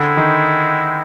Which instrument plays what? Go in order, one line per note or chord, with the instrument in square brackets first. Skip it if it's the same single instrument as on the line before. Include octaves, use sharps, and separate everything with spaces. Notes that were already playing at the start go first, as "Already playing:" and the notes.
Already playing: [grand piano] D3 [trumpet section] G#3 C4 E4
[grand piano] D#3